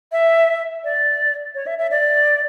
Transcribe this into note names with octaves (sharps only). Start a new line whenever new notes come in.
E5
D5
C#5
E5
E5
D5